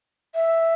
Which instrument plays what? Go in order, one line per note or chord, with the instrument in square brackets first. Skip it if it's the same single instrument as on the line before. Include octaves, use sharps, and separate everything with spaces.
[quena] E5